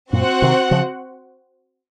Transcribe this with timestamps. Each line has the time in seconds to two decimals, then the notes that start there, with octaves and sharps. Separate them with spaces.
0.12 F#2 A#2 C4 F#4 C5 F#5
0.42 C3 D#3
0.71 C#3 F3